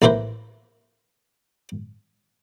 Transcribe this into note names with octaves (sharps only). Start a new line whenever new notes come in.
A1 A#3 E4 B4 C5